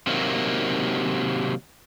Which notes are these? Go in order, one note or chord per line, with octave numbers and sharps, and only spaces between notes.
C3 D#3 F#3 A#3